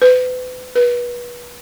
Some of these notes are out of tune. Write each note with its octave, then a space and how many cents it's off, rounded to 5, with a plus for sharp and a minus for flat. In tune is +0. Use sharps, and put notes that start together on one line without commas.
B4 +35
B4 -30